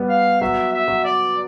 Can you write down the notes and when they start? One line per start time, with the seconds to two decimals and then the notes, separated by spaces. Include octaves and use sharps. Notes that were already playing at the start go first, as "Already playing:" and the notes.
Already playing: G3 B3
0.10 F5
0.41 F#3 E5
0.73 E5
0.88 F#3
1.04 D5